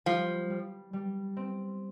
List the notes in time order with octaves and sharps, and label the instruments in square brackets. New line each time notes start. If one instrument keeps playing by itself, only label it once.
[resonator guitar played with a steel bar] F3 [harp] G3
[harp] G3
G3
C4